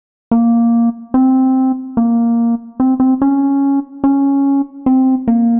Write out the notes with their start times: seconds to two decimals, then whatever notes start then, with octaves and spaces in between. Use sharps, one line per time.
0.31 A#3
1.14 C4
1.97 A#3
2.80 C4
3.00 C4
3.22 C#4
4.04 C#4
4.86 C4
5.28 A#3